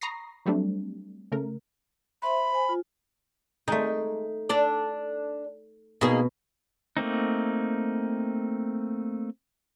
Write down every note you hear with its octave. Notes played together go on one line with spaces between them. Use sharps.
A#5 B5 C#6 D#6 A#6 C7
F#3 G3 A3 C4 D4
C#3 A3 A#4
C5 E5 B5 C6
C5 G#5
F4
G#3 A3 D#4
D4 A4 D5
B2 A#3 D#4 G#4
A3 A#3 C4 D#4